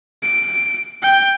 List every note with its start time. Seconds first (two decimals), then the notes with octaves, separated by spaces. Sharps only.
0.22 D7
1.02 G5